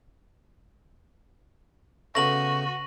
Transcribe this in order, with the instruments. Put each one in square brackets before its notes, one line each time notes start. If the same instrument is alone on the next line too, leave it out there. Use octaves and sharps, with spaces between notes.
[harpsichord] C#3 A3 B3 [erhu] F#4 [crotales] C#6 [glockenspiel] A#6 F#7